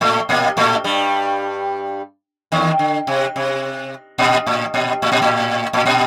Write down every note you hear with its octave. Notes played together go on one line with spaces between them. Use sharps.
A2 A3
A#2 A#3
A2 A3
G2 G3
D#2 D#3
D3
C3
C3
A#2
A2
A#2
A2
A#2
A2
A2
A#2